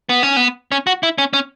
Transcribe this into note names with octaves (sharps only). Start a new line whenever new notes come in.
B3
C#4
B3
C#4
F#4
E4
C#4
C#4